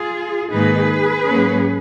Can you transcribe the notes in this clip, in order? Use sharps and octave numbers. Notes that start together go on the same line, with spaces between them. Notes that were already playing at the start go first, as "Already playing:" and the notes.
Already playing: F4 G#4
G#2 D#3 A#3 D#4 G#4 B4
G#2 F#3 A#3 C#4